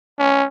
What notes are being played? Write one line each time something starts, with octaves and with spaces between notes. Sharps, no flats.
C#4